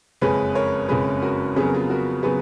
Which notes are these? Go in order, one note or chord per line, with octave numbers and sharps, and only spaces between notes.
F#1 F2 C#3 G#3 C#4 G#4 B4
A#4 C#5
F#1 F2 C#3 G#3 C#4 G#4 B4
F#4 A#4
F2 C#3 F#3 B3 G#4
A#4
F4 G#4
F#4 A#4
C#3 F#3 B3 G#4 B4